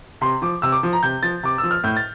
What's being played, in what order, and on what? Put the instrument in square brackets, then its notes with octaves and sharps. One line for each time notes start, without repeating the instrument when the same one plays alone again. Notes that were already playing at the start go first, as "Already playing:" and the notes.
[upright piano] C3 C6
F3 D6
C3 E6
D6
F3
A#5
C3 G6
F3 A6
C3 D6
E6
F3
F6
A2 G6
A6